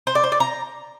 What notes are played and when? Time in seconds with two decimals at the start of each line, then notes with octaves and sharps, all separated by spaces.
0.07 C5
0.15 D5
0.24 C5
0.32 D5
0.40 A#5